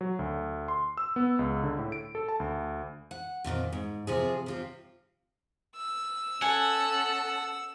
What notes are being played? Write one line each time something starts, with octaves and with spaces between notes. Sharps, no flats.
F#3
D2
C6
E6
B3
C#2
D3
A2
D7
A4
A5
D2
F#5
F2 A#2 D3 D#3
G#2
C3 F3 G#4
C3 F3 C4
E6
C#4 A4 F#5 G#5